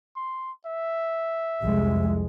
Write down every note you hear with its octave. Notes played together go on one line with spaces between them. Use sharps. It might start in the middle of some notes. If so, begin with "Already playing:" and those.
C6
E5
C2 F2 G#3